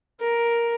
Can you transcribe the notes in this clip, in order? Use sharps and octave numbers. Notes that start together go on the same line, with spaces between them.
A#4